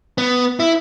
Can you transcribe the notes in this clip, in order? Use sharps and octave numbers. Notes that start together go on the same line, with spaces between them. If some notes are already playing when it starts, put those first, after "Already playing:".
B3
E4